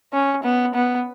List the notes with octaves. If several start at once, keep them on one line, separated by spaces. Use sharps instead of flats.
C#4
B3
B3